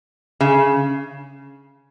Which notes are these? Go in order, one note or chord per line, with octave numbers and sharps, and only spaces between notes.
C#3